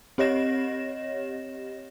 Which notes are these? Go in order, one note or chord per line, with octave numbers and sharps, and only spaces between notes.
C4 G4 C#5 D#5 A#6 E7